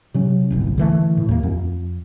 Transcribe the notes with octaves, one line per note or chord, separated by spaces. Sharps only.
C3 F#3 C#4
D1 G1 C2
D3 E3 A3
A2
D#2 A#3
F2